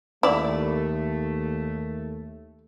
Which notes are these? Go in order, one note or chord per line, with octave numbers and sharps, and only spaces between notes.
D#2 A3 E4 D5